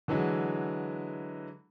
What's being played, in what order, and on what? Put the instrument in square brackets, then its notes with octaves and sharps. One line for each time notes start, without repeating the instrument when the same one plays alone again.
[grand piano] D3 E3 F#3 G#3